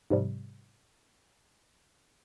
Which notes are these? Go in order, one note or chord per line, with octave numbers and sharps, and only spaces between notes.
G#2 C3 F3 G3